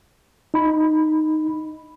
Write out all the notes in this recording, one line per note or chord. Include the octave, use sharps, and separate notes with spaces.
D#4 B5